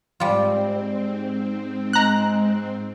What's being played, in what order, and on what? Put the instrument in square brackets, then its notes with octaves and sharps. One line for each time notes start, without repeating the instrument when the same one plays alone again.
[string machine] G#2 C4 [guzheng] G3 F4
[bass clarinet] G#3 [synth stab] A#5 F#6